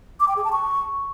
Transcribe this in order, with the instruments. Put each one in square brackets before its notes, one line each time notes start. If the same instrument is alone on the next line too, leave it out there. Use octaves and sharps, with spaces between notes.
[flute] D6
G5
G#4
A5
C#6